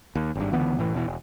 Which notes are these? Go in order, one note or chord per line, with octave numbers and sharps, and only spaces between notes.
D#2
G#1 G2
C#2 D3 E3 B3
F#1 A2 E3
E1 B2 E3
E1